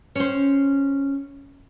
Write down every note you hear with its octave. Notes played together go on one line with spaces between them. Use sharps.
C#4 C5